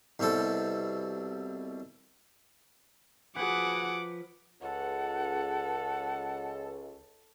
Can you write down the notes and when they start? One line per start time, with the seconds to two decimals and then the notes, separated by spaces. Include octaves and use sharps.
0.19 C2 B2 C4 A4
3.36 F3 F#4 G#4 B4 F#5 D6
4.62 C#2 A4 F#5